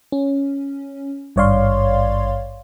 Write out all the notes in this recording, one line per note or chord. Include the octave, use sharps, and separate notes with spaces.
C#4
G#1 G2 C#5 D5 F5 C6